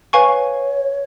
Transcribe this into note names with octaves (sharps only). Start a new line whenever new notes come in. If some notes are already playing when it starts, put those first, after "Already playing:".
B4 C#5 F5 G#5 C#6